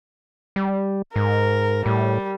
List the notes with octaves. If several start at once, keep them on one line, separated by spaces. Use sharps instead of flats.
G3
G#2 A#4
A2 G3